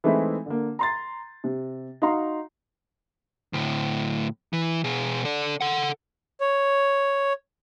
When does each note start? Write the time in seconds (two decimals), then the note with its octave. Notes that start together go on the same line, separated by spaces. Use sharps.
0.04 E3 G#3 A3 C4 D#4 E4
0.46 D3 A#3
0.79 A#5 C6 A6
1.44 C3
2.02 D#4 F#4 F5 A#5 C6
3.53 D2 A2
4.53 E3
4.84 B2 G#4
5.25 A4 D5
5.61 A4 F#5
6.41 C#5